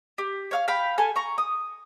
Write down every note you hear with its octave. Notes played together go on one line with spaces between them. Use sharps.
G4
C#5 F5 F6
F5 G5 B5
A4 G#5 F6
A#5 C#6
D#6